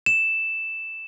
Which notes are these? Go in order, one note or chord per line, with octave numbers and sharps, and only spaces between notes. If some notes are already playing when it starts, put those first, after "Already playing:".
E7